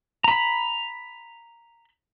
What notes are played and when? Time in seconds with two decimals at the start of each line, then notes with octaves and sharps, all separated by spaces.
0.24 A#5 B5